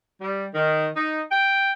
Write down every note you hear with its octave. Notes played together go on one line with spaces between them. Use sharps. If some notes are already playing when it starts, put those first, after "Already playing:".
G3
D#3
D#4
G5